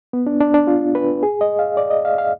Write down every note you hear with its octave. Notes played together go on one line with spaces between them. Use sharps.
B3
D4
D4
D4
F4
B4
G#4
D#5
F5
D5
D#5
F5
F5